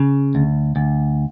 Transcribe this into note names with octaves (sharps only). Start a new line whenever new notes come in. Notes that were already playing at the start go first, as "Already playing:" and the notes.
Already playing: C#3
D2
D2